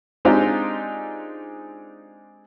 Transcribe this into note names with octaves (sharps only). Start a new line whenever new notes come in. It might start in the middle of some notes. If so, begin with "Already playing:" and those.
G#3 C4 D4 D#4 F4 G4